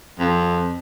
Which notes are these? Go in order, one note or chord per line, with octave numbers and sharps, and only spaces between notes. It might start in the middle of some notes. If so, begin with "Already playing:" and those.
F2